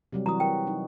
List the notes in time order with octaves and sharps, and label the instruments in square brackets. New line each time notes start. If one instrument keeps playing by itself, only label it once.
[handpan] C3 F#3 G3
[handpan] E3 F#3 F#4 [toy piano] A#5 D#6
[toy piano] A#4 G5
[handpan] D#4